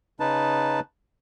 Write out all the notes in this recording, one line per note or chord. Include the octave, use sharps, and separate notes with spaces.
C#3 D#4 B4 A5